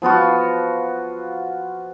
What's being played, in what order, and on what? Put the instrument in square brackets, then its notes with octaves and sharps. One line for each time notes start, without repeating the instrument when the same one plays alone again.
[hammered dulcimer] F3 B3 F4 F#4